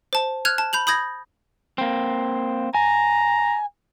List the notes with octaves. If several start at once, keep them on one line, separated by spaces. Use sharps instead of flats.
C5 A5
F6 F#6 G#6 F7
A5
B5 G6 F7 F#7
B5 D#6 G6 G#6 A#6
A#3 C4
G#5 A#5